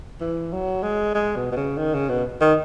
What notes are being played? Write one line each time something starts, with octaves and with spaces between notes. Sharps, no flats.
E3
F#3
G#3
G#3
B2
B2
C#3
D#3
C#3
B2
D#3